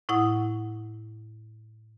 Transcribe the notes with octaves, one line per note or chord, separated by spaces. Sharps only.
A2 E4 F#5 D#6